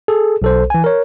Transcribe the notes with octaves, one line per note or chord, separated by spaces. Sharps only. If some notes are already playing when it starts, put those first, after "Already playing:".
G#4 A4
B1 A4 C5
E3 G#5
A#4 C#5